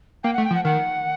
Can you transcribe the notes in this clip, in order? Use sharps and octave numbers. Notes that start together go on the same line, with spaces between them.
A#3 G5
A3 F#5
G5
F3
F#5
D#3 F#5